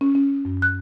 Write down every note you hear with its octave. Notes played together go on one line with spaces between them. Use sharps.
C#4
C#4
F#2
F#6